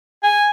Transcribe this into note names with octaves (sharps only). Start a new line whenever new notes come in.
G#5